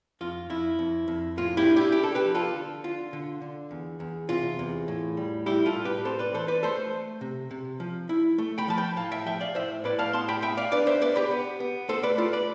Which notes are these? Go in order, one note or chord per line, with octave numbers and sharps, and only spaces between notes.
F2 F4
F2 E4
F2
F2
A2 F4
E4 G4
D4
E4 G4
D4 G4
A4
G4 B4
F3
F4 A4
D3
D3 F4
D3
D3
E2
E2
C3 F4
E2
A2
G3
G3 E4 G4
F4 A4
A2
G4 B4
C4 A4 C5
B4 D5
E3 A4 C5
B4 D5
A3 A4 C5
A3
C3
C3
F3
E4
A3
G5 B5
F3 A5
G5 B5
A2 F5 A5
E5 G5
F3 E5 G5
D5 F5
A2 C5 E5
A2 B4 D5
F5 A5
B3 A5 C6
G5 B5
B3 E5 G5
D5 F5
D4 B4 D5
C5 E5
B3 B4 D5
G4 B4
B3
B3
A3 A4 C5
B4 D5
A3 F4 A4
B4 D5